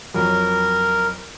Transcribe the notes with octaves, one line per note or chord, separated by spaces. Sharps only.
F2 F#3 A#4